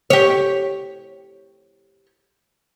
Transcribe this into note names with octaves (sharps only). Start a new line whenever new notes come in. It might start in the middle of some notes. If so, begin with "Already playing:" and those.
G4 C#5